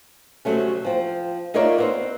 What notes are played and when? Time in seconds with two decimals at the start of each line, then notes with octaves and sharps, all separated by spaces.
0.45 D2 G2 C3 F#3 A3 C#4
0.85 F3 C4
1.54 D#4 F4 A#4 C#5 D5 E5
1.78 B3 C4 C5